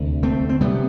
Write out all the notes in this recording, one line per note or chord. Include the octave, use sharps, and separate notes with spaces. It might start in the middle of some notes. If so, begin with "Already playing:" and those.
Already playing: D2 C3
A3 C4
C4
C3 G3 B3